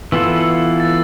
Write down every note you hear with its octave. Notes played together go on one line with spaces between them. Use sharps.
E3 B3 F4 A4 E6
E6
A6